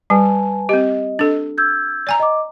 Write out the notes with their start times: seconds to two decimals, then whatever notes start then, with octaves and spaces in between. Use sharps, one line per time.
0.10 G3 B4 G#5 A5
0.69 C4 G4 D#5
1.19 D4 A4
1.58 E6 G6 G#6
2.07 D5 G#5 A#5
2.20 D#5 D6